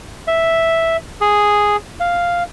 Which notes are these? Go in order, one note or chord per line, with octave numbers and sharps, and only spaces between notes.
E5
G#4
F5